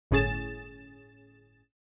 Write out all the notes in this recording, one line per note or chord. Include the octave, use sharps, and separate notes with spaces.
G1 A2 C#4 G#4 A6 E7